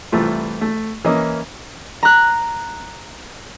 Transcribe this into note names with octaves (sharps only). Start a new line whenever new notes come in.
C2 E3 A3 F4
A3
E3 A#3 C#4 D#5
A#5 F#6